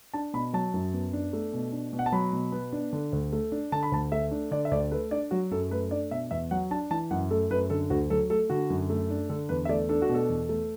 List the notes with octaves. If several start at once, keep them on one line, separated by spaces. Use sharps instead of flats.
D4 A5
B2 B5
F#3 A5
F#2
B3
D4
A3
B2
D4
B2
F#5
A5
F#3 B5
B2
B3
D4
D3
D2
A3
D4
D3 A5
B5
D2 A5
A3 E5
D4
D3 D5
E5
D2 D5
A3 B4
D4 D5
F#3 F#4
F#2 A4
A3 B4
D4 D5
B2 E5
E2 E5
F#3 F#5
D4 A5
E3 A5
F#2 F#5
A3 A4
F#2 B4
D3 A4
D2 F#4
F#3 A4
A3 A4
D3 F#4
F#2
A3
D4
D3 A4
E2 B4
E5
A3 D5
D4 A4
F#4
B2 A4
E2
A3